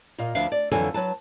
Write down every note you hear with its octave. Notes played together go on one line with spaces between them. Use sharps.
A#2 F4 D#5
D2 F3 D4 B4 E5 F5
D5
F2 D3 E3 F#3 A4 G#5
F#3 B4 A5